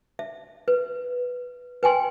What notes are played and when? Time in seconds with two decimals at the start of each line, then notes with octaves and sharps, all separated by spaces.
0.19 E5
0.68 B4
1.83 B4 G5 G#5 C6